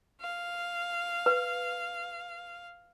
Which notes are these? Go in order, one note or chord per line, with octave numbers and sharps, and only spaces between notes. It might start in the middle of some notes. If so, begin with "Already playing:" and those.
F5
B4